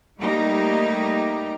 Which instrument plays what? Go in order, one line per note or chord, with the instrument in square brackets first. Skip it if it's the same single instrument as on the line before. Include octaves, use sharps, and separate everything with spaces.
[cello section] G3 A3 A#3 D#4 G4